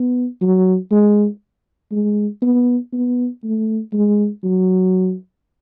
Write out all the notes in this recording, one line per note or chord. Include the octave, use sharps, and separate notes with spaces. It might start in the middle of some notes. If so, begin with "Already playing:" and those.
Already playing: B3
F#3
G#3
G#3
B3
B3
A3
G#3
F#3